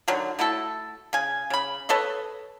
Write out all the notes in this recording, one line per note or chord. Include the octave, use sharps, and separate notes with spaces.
D3 D#3 F#3
A3 E4 F#4 A4
C#3 G#5
C#3 B5
A4 B4 C#5 D#5